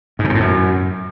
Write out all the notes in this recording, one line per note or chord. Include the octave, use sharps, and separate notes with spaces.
G#2
C#3
A#2
A2
F#2